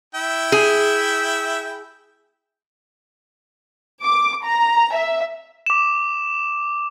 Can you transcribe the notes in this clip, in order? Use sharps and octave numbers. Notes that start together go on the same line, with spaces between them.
E4 E5 G5
G#4
D6
A#5
E5
D6 E7